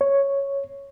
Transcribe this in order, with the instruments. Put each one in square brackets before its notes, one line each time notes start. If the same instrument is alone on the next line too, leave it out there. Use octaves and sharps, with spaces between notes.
[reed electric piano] C#5